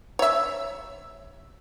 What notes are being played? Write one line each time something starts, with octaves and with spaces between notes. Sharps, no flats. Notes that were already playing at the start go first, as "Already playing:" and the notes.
C#5 E5